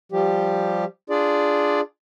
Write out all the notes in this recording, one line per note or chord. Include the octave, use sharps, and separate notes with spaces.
F3 G3 G4
D4 F4 G#4 D5